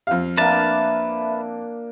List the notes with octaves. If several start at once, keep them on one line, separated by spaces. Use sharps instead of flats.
F2 F5
A#3 D4 B4 E5 A5